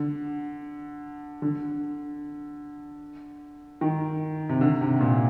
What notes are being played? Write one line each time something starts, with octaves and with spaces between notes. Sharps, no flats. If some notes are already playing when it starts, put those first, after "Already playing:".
Already playing: D3
D3
D#3
C3
D3
C3
A#2